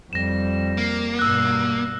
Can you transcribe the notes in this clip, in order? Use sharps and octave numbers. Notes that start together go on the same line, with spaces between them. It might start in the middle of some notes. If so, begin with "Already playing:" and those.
F2 G3 A#6 E7
A#3
G2 B2 E6 F#6